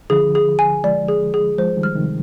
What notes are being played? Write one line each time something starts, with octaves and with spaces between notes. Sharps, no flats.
D3 F3 G#4
G#4
G#5
F3 G#3 D5
G#4
G#4
F3 G#3 C5
D#3 G3
F6
C3 D#3